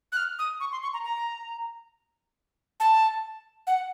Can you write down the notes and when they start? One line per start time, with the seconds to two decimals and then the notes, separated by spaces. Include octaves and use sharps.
0.12 F#6
0.17 F6
0.39 D#6
0.60 C#6
0.72 C6
0.83 C#6
0.94 A#5
1.04 A#5
2.80 A5
3.67 F#5